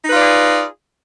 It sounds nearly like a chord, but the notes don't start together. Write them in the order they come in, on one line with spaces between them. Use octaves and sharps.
D#4 B4 F4 D5 G#4